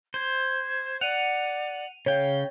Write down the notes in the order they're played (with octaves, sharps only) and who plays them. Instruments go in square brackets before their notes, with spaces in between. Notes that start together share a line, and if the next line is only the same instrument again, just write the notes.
[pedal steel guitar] C5 [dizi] G#6
[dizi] D5 [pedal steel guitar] F#5 [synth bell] D#7 F7
[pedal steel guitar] C#3 G5 [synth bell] C#5 [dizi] F5